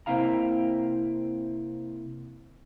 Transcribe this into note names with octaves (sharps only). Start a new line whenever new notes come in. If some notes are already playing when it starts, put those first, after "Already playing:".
C3 A#3 C4 E4 F5 A#5